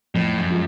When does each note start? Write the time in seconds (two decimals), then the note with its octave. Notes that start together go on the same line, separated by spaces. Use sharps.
0.14 F2 A2
0.38 F#2
0.51 F3 G#3